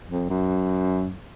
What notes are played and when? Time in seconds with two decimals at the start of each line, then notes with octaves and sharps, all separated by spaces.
0.10 F2
0.29 F#2